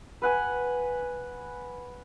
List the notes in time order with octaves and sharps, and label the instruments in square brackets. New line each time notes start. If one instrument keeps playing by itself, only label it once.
[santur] B4 F#5 G#5